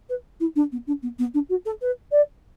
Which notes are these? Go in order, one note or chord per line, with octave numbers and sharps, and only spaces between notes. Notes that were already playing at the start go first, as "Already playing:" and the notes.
B4
E4
D4
B3
D4
B3
B3
D4
F#4
A4
B4
D5